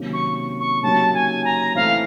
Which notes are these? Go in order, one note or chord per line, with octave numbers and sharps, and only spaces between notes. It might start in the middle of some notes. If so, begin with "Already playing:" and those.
Already playing: C3 D#3 F#3 A#3 C#4
C#6
C#6
C#3 F#3 A#3 D#4 G4 A5
G#5
A#5
E3 A3 C4 E4 F5